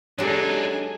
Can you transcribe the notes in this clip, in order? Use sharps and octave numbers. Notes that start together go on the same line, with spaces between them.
F#3 G#3 D4 D#4 G4 A4 C#5 G#5